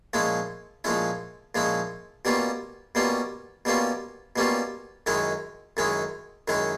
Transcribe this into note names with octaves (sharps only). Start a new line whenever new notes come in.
A#2 F3 G#3 C#4 E4
A#2 F3 G#3 C#4 E4
A#2 F3 G#3 C#4 E4
B2 G3 A#3 C#4 F4
B2 G3 A#3 C#4 F4
B2 G3 A#3 C#4 F4
B2 G3 A#3 C#4 F4
F#2 D#3 G#3 C#4 E4
F#2 D#3 G#3 C#4 E4
F#2 D#3 G#3 C#4 E4